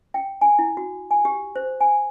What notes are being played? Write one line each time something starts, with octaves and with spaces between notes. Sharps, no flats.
G5
G#5
E4
F#4
G#5
G4
C5
G#5